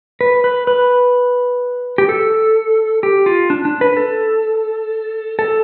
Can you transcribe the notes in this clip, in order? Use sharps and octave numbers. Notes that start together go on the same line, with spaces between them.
B4
B4
B4
G4
A4
G4
F4
D4
D4
B4
A4
A4